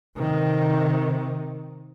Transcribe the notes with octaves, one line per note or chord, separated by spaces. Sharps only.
C3 D#3